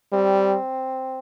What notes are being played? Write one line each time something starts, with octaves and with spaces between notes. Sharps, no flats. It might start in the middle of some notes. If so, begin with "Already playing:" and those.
G3 C4